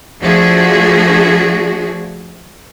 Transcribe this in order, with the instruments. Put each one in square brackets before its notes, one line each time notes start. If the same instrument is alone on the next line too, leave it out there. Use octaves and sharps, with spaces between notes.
[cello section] F3 A3 D4 F#4 G#4